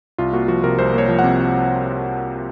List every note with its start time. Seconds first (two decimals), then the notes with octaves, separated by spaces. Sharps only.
0.18 C2 F4
0.33 A#3 F#4
0.48 F3 F#4
0.64 C3 A#4
0.78 C2 C5
0.94 A#3 C#5
1.08 F3
1.19 F#5
1.24 C3